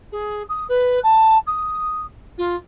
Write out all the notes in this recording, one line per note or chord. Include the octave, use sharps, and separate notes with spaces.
G#4
D#6
B4
A5
D#6
F4